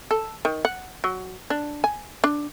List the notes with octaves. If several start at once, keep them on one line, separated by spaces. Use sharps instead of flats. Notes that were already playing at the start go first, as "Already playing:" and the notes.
A4
D#3
F#5
F#3
D4
G#5
D4